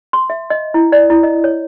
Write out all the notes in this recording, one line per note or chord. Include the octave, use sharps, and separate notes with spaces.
C6
E5
D#5
E4
D5
E4
D#5
C#5